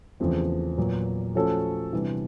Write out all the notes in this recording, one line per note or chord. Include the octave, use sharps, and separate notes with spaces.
E2 C#3 F3 A3 C4
A#2 F#3 B3
F3 A3 C#4 F#4 A4
C3 E3 G3 B3 D4